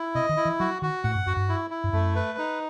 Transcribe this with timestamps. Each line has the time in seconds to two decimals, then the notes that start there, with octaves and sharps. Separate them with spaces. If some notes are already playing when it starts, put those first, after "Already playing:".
Already playing: E4
0.15 C3 D#5
0.29 D#3
0.37 E4
0.45 E3
0.59 F#3 F#4
0.82 D#3 F#4
1.04 A2 F#5
1.15 G2
1.26 F#2 F#4
1.36 G2
1.49 E4
1.70 E4
1.84 G2
1.93 F#2 A3
2.15 B4
2.38 D#4